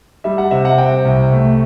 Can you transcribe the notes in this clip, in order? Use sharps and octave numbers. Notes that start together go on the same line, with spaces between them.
G3 E5
F#5
C3 E5
F#5
C4 G5
C2
A3